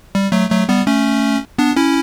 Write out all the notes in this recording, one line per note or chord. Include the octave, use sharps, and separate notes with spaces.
G3
F#3 A3
F#3 A3
G3 B3
A3 C#4
B3 D4
C#4 E4